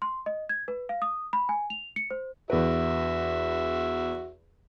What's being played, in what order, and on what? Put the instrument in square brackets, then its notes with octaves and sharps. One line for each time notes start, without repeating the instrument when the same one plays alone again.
[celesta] C6
D#5
G#6
B4
F5
D#6
B5
G#5
F7
C#7
C5
[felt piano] E2 B4 [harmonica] F#4 E5